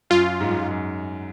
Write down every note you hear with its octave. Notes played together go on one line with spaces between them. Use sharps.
F#2 F4
G#2
F#2
G#2
F#2